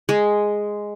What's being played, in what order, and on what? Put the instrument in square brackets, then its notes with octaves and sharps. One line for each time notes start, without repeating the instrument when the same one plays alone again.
[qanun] G#3